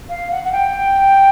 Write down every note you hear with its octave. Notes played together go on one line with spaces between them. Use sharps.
F5
F#5
F#5
G5